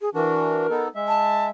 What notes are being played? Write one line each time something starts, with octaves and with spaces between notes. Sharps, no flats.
G#4
E3 D4 F#4 A#4
B3 D#4 A4
G#3 E5
A5